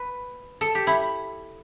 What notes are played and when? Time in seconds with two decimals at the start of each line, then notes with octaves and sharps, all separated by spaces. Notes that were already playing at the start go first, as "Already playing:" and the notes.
Already playing: B4
0.61 A4
0.75 G4
0.87 E4